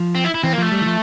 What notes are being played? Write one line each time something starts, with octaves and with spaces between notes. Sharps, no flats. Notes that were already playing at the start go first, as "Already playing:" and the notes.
Already playing: F3
C4
E4
E4
E3 C4
A#3
F3 A3
G3
E3
F3